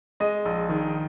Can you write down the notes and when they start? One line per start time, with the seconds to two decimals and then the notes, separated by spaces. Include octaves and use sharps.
0.20 G#3 D#5
0.45 A#1
0.69 D#3